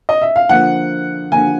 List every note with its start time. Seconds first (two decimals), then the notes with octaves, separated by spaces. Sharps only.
0.09 D#5
0.22 E5
0.36 F5
0.49 D3 F3 A#3 F#5
1.32 D3 F3 A#3 G#5